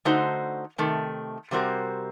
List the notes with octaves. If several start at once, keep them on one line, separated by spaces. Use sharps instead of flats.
D3 A3 D#4 F#4 C5
C3 D#3 A3
C3 G3 C4 F#4 A#4